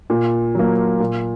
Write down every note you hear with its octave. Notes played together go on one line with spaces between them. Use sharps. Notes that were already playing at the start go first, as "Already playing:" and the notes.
A#2
F#3 A#3
A#2